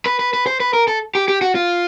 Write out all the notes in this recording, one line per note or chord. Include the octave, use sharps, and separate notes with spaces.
B4
B4
B4
C5
B4
A#4
A4
G4
G4
F#4
F4